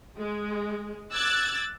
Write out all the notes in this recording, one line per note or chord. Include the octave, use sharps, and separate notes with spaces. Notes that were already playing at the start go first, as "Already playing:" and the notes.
G#3
D6 E6 F#6 G#6 A6